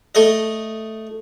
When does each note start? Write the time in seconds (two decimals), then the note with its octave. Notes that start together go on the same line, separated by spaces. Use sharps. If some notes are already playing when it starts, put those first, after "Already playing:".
0.15 A3 D#5